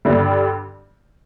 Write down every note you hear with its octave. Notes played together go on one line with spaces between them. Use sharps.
G2 D3 G3